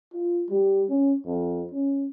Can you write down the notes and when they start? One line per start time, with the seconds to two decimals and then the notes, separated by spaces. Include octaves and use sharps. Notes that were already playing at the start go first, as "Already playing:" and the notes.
0.13 F4
0.50 G3
0.89 C#4
1.26 F2
1.72 C#4